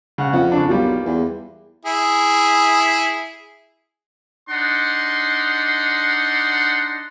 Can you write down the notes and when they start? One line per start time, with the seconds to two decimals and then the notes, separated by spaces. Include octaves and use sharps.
0.18 C#3 F#5 F#6
0.33 F2 F#5
0.52 C#3 D4
0.69 B1 G3 A#3 F4
1.05 E2
1.85 E4 G#4
4.50 D4 D#4 F#5 C6